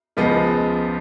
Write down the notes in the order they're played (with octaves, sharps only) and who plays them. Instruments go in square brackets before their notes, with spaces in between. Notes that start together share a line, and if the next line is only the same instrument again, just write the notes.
[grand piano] C#2 C#3 F3 G#3 B3